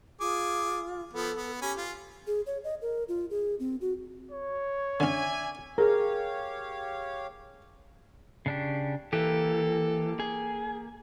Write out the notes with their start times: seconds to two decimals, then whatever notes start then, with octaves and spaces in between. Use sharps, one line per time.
0.20 F4 G#4 D6
1.13 F3 B3 A4
1.37 B3
1.62 C#4 G4 G#5 B5
1.78 F4
2.27 G#4
2.46 C#5
2.64 D#5
2.82 A#4
3.08 F4
3.30 G#4
3.60 C4
3.81 F#4
4.31 C#5
5.00 D3 C#4 D5 E5 G#5
5.78 G4 G#4 A#4 C#5 F5
8.46 C#3 D4 G4
9.13 E3 A#3 G4 A4
10.20 G#4